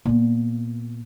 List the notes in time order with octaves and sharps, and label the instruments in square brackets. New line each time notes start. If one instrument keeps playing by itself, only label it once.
[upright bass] A#2 B3